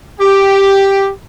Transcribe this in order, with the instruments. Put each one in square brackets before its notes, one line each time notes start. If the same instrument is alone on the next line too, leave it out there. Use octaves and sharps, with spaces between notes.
[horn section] G4